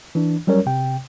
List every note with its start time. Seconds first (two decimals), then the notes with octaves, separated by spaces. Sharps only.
0.15 E3 D4
0.47 F#3 G3 C#4 A#4 C#5
0.66 C3 G5